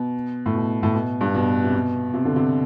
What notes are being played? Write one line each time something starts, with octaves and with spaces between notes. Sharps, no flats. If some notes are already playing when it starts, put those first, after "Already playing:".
Already playing: B2
A2
B2
A2
B2
G2
B2
C3
B2
C3
D3
C3